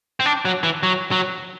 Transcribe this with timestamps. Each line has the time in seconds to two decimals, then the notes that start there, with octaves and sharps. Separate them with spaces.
0.20 C4
0.26 D4
0.45 F#3
0.63 E3
0.83 F#3
1.12 F#3